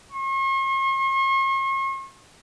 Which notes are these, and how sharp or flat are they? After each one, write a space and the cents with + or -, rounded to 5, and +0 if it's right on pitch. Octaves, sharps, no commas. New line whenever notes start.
C#6 -45